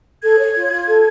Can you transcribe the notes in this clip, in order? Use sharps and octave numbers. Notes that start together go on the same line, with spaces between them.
A4 G#6
C#5
F4
F4
A4